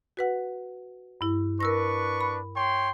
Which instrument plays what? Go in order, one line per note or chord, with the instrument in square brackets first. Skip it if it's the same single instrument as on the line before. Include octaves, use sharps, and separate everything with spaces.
[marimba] F#4 B4 F#5
G2 E4
[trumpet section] D4 B4 C#6 [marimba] A#4 E6 A#6
[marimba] B5
[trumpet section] C#5 G5 C6